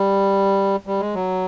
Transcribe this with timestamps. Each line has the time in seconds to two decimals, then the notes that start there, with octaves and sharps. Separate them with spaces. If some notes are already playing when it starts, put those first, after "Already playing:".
Already playing: G3
0.87 G3
1.00 G#3
1.14 F#3